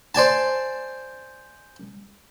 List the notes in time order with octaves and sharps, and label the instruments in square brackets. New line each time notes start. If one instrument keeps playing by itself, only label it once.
[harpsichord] C5 D5 G#5 A5